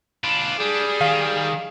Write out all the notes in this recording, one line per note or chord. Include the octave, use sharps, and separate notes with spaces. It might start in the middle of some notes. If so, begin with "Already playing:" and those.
D4 F4 B4
G3 G#4
D#3 F5